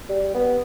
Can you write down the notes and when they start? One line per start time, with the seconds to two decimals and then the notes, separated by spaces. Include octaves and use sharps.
0.09 G3
0.35 B3